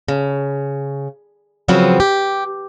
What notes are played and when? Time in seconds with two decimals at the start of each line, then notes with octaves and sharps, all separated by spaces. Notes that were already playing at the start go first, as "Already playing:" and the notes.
0.08 C#3
1.68 C#3 F3 F#3 B3 C4
2.00 G4